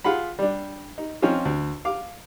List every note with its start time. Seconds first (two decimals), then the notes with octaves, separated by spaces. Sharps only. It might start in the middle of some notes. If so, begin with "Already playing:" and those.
0.04 F4 G#4 F#5 B5
0.39 G3 D4
0.98 D#4
1.22 F3 C4 C#4 D#4 F4
1.45 D2
1.85 F5 D6